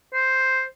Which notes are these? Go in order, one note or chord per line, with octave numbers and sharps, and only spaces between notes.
C5